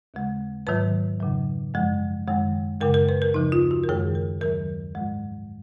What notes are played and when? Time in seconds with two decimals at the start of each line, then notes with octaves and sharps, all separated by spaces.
0.14 D#2 C#3 G#3
0.67 G#2 D#3 F#3 B4
1.20 F2 C#3 F#3
1.74 F#2 F3 G#3
2.28 F#2 D#3 G#3
2.81 F#2 C#3 G#3 A#4
2.94 A#4
3.09 B4
3.22 A#4
3.34 D#2 C#3 F3 D#4
3.52 F4
3.71 F#4
3.84 A#4
3.88 F#2 D#3 G#3 G#4
4.15 A#4
4.41 D#2 D#3 F#3 A#4
4.95 G#2 F3 G#3